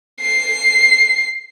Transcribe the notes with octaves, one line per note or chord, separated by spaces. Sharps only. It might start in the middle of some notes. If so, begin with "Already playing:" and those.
C7